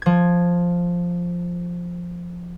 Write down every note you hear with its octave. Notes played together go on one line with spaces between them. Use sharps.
F3 G#6